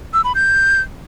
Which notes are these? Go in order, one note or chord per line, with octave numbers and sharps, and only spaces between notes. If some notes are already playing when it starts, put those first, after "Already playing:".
E6
B5
G6